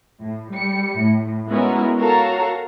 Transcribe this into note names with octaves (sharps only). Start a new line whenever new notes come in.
A2
G3 C#7
A2
G#3 B3 C#4 E4 F#4 A#4
F#4 A4 A#4 C#5 F5 A#5